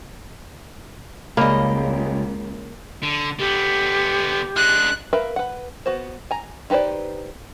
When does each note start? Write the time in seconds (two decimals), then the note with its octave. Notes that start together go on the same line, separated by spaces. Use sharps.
1.37 C#2 C#3 G3 A#3 D#5 B5 C#6
3.03 D3
3.39 D3 B3 G4
4.56 G#3 D4 F#6
5.13 A#4 B4 E5 F5
5.36 B4 F#5
5.86 B3 F#4 C5
6.31 G#5 A#5
6.70 D#4 G4 B4 C5 D5